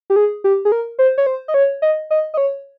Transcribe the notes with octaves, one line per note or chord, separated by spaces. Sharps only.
G4
G#4
G4
G#4
A#4
C5
C#5
C5
D#5
C#5
D#5
D#5
D#5
C#5